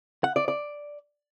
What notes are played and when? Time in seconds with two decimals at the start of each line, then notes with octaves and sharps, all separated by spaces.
0.24 F#5
0.36 D5
0.48 D5